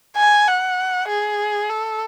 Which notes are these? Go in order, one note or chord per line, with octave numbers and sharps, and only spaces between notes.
G#5
F#5
G#4
A4